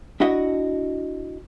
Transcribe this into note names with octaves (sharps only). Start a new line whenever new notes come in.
D4 E4 F#4 D#5